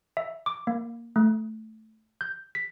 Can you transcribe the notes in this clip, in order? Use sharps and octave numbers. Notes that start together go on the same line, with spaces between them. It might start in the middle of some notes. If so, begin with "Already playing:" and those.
E5
D6
A#3
A3
G6
B6